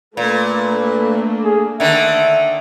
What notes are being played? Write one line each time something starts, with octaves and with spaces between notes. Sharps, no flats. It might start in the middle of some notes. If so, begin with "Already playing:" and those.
A#2 A3 A#3 D4 B4
G#4
D3 D#3 E5